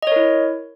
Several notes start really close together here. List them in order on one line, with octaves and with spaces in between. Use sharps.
D#5 C#5 A#4 E4